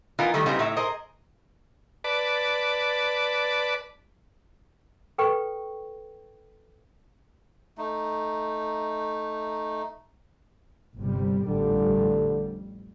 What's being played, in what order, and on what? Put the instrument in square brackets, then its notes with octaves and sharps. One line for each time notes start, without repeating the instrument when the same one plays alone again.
[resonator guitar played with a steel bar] E3 B3 D#4 F4 A#4
D#3 G3 A3
C#3 G3 B3 C4 D#4 E4
A2 D#4 E5
G#4 A#4 C5 D#5
[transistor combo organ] B4 D5 A5
[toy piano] A4 B4 G5 C#6
[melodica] A3 D#4
[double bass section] G1 C3 G3
[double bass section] A1 F2 G3 [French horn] D3